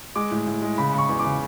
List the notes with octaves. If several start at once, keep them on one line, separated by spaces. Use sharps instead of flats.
G#3 D6
A2
A2
G#3
C#3 B5
C#3 C#6
E2
C#3 D6